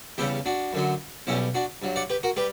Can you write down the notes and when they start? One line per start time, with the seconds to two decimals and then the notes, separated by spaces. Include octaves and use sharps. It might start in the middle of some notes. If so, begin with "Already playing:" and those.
0.18 E2 C#3 G3 E4 G4
0.46 D4 F#4
0.73 F#2 D3 F#3
1.27 B1 B2 G3 C#4 E4
1.55 D4 F#4
1.82 G2 F#3
1.96 D5 F#5
2.10 G4 B4
2.23 F#4 A#4
2.36 G3 G4 B4